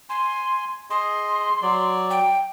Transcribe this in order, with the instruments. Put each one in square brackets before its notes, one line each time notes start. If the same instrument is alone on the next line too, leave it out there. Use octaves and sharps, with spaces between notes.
[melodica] G#5 [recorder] C6
[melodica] G#4 D#5 [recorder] C6
[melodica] F#3 D5
[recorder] G5